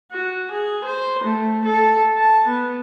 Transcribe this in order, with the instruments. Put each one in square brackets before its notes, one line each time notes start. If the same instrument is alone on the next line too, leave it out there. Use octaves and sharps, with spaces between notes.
[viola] F#4
G#4
C5
A3
A4
A5
B3